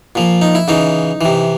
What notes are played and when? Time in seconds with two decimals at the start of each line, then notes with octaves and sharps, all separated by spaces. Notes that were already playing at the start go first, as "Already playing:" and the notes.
0.15 A#2 F3
0.42 D#4
0.55 E4
0.68 C#3 E3 D#4
1.21 C3 E3